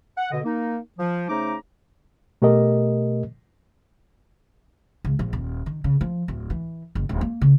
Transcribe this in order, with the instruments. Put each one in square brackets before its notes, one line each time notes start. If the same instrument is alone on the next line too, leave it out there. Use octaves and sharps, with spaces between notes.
[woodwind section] F#5
B2 D3 D#5
A#3 D#4
F3
C#3 A3 D#4 C5 A#5 D6
[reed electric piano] B2 A3 G4 A#4 D#5
[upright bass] C#2
A#1
D#1
D#3
C#3
F3
D1
E3
F#1
D#1
A#3
C#3